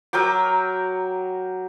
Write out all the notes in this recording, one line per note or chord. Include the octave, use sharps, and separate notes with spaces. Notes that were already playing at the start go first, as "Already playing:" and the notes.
F#3 A#4 G5 D6